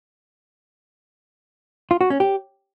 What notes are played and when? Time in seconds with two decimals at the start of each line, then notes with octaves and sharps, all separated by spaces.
1.91 F4
2.01 F#4
2.10 C#4
2.20 G4